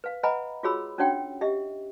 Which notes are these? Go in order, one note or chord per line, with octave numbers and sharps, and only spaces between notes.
B4 F5
B4 D#5 F#5 G#5 A#5 B5
F4 F#4 G#4 C#5 B5 E6
C#4 D4 F#4 C#5 F#5 G5
G4 D#5 E5